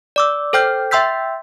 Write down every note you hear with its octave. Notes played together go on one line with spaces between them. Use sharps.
D5 D6 E6
A4 C5 G5 F6 G6
E5 G5 C6 E6 G6 B6